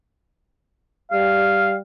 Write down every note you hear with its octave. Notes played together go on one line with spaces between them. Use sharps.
G3 F5